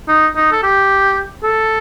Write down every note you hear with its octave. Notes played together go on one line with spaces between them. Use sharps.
D#4
D#4
A4
G4
A4